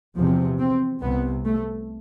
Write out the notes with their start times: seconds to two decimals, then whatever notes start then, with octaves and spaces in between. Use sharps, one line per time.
0.16 E2 C3 F3
0.59 C4
1.02 C2 C3 B3
1.45 A3